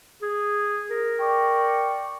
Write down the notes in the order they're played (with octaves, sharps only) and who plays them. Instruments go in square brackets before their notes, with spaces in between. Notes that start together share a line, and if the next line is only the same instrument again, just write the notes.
[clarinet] G#4
A#4
[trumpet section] D5 G5 C#6